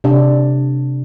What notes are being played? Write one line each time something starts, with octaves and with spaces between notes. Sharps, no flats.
C3 D4